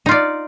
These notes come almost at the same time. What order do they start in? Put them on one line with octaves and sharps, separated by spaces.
D#4 F4 D5